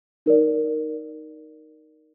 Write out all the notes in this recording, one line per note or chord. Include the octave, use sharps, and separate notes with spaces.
D#4 A#4 D5